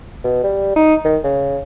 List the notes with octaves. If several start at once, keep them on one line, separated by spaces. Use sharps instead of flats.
B2
G3
D#4
D#3
C#3